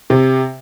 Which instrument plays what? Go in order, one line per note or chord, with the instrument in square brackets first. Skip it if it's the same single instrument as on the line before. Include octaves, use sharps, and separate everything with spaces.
[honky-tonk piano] C3